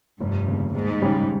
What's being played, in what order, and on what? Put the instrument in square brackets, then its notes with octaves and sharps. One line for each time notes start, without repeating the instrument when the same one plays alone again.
[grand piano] F1 [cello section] G2
[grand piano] D#2 C#3
[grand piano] D#2 [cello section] G#2
[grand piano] C#3 G3 C#4 G4